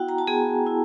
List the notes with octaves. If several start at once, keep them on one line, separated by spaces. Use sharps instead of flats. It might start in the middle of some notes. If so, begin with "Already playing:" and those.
Already playing: B3 E4 F#4 F#5 G5
A#5
A5
B3 G#4 G#5
E4